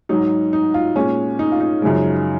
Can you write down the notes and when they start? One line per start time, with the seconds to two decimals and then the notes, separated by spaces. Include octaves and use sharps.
0.09 G#2 F#3 D#4
0.53 D#4
0.74 F4
0.96 A#2 G#3 C#4
1.39 D#4
1.52 F4
1.61 D#4
1.82 F#2 C#3 F3 G#3